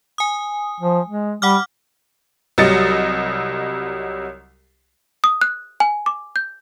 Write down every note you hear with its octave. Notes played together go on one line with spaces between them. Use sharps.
G#5 D#6
F3
G#3
G3 F#5 D6 F6
C2 F#3 G3 D#5 A6 C#7
D#6
F#6
G#5
D6
G6